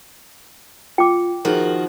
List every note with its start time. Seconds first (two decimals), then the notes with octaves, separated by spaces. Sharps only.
0.98 F4 G5 D6
1.45 D#3 F3 F#4 G#4 A#4